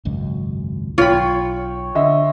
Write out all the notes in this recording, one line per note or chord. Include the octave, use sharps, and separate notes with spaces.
G#1 C#2 F#2
B1 F4 C#5 G5 B5
D3 D#5 E5